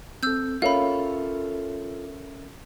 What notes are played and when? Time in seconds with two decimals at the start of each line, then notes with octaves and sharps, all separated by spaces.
0.23 C4 A4 E6 G6
0.62 C#4 F4 A4 A#4 C#5 E5 F5 B5